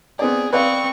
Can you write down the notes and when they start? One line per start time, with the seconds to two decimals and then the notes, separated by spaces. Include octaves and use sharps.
0.19 B3 C4 G#4 D5
0.53 C4 B4 D5 F5 C#6